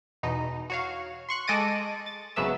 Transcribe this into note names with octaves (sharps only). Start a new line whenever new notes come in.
E2 B2 D#4
F#4 C#5 F5
C6 C#6 F#6
G#3 A4 D#5 D6 A6 D#7
A6
G#1 C#3 F#3 B3 E5 E6